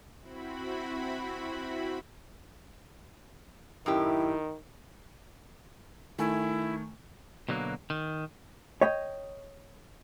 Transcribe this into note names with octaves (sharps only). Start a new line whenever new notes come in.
C4 E4 F#4 B5
F#2 A2 D#3 E4 G4
D#3 A3 E4 G#5
B2 D3 F#3 A3 A#3
D#3
C#5 D#5 G5